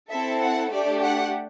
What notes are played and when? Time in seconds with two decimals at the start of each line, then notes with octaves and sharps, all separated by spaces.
0.10 C4 E4 A4 E5
0.41 F#5
0.72 A3 D4 G4 D5
1.02 F#5